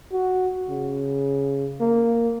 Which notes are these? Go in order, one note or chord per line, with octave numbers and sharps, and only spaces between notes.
F#4
C#3
A#3